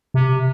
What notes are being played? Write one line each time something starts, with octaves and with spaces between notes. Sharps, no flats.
C3